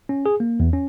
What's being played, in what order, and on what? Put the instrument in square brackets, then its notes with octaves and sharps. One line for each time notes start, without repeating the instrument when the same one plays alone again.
[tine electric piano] C#4
G#4
A#3
E2
C#4